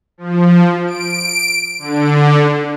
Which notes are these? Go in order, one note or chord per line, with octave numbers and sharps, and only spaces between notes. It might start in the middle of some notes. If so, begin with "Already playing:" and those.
F3
D7
D3